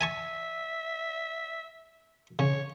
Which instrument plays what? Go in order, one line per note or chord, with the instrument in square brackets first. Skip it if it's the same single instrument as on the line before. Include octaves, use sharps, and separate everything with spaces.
[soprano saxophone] E5 [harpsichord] G#5 A5 C#6
[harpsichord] C#3 [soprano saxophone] C#5